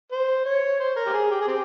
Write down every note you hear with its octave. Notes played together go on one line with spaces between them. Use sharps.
C5
C#5
C5
A#4
G4
G#4
G4
G#4
C4 G4